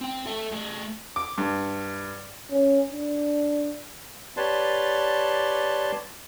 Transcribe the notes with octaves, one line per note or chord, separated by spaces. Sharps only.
C4 G5
A4 E5
A3 G#4
D6
G2
C#4
D4
G4 B4 C#5 D5 A5 C6